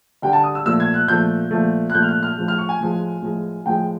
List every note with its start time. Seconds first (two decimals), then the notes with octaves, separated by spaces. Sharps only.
0.22 D3 G3 G5
0.33 A5
0.44 D#6
0.55 E6
0.65 A#2 F3 A3 E6
0.80 G#6
0.94 F#6
1.08 A#2 F3 A3 G6
1.51 A#2 F3 A3
1.90 F#6
1.94 A#2 F3 A3 G6
2.03 F6
2.09 F#6
2.23 F6
2.37 A2 F3 G#3
2.48 F6
2.58 C#6
2.69 G#5
2.81 A2 F3 G#3
3.22 A2 F3 G#3
3.66 A2 F3 G#3 G5